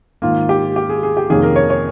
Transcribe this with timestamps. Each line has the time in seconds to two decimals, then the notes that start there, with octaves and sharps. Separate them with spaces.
0.22 G#2 D#3 A#3 F4
0.49 G4
0.76 G4
0.89 G#4
1.03 G#4
1.17 G4
1.30 F2 C3 D#3 A#3 C#4 G#4
1.43 A#4
1.56 C#5
1.70 C#5